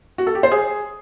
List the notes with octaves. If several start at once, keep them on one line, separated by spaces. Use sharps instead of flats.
F#4
A4
G4
C5
G#4